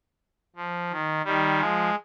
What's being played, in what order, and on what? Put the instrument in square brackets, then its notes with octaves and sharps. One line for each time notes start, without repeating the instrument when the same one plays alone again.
[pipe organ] F3
D#3
D#3 G3
F3 G#3